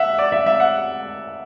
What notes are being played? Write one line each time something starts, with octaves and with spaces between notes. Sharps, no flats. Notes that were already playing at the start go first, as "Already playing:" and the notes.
Already playing: E5 F#5
D5
E5
E5
F#5